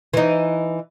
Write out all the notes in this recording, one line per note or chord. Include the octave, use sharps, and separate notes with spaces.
E3 D#4